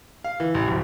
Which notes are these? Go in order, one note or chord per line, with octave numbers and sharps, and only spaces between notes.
F5
E3
A1
D1